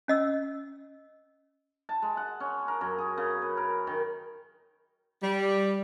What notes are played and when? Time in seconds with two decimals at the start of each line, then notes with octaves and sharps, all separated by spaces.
0.08 C#4 D#5 E6
1.89 A5
2.02 G#3
2.17 F#5
2.40 C#4
2.68 A#4
2.81 F#2
2.98 G#4
3.18 C#3
3.42 B4
3.57 A#4
3.87 D#3
5.22 G3